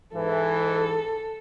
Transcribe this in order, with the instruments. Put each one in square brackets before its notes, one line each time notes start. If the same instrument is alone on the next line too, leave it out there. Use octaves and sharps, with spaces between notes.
[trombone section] G#2 E3 [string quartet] A4